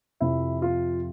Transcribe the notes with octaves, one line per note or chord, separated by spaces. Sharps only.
F2 C3 F3 E4
F4